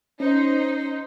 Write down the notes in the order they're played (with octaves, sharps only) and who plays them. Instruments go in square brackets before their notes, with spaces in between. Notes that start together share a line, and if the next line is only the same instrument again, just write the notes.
[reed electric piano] C#4 [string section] D#4 [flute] C5